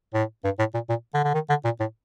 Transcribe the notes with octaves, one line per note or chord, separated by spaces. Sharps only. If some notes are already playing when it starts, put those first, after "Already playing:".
A2
G2
A2
A#2
A#2
D3
D3
D#3
D3
A#2
A2